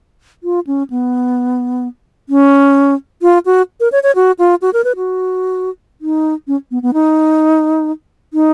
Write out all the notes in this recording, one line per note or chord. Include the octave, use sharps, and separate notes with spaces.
F4
C#4
B3
C#4
F4
F#4
A#4
C#5
C#5
F#4
F4
F#4
A#4
B4
F#4
D#4
C#4
B3
B3
D#4
D#4